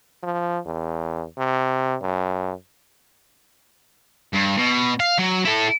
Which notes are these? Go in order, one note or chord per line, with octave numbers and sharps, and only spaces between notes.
F3
E2
C3
F#2
G2
B2
F5
F#3
E4 A4